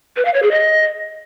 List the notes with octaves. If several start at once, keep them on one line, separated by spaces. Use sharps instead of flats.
B4
F5
C#5
G#4
D#5